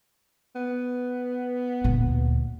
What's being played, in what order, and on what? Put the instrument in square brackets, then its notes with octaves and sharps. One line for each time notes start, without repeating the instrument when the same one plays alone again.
[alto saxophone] B3
[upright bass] D2 A#2